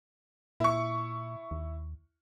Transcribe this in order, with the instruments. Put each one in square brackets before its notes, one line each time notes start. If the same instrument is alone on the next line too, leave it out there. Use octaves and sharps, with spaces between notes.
[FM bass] A#2 [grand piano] E4 C#6
[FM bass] D#2